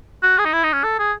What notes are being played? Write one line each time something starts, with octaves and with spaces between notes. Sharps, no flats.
F#4
G#4
D#4
E4
D#4
C#4
A4
G#4